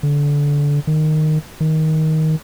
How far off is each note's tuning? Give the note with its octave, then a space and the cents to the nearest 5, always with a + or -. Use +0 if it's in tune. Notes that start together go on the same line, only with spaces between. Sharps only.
D3 -20
D#3 -10
D#3 +15